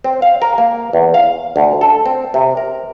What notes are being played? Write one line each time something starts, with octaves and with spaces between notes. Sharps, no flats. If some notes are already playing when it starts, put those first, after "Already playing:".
C4
F5
A#4
A#3
E2
F5
D2
A4
C4
C3
A#4